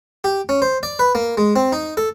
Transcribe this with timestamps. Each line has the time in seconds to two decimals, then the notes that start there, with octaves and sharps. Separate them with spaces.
0.24 G4
0.49 C#4
0.62 C5
0.83 D5
0.99 B4
1.15 A#3
1.38 G#3
1.56 C4
1.73 D#4
1.97 A4